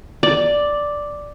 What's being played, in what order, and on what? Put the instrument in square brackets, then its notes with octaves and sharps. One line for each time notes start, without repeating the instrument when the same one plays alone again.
[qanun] D5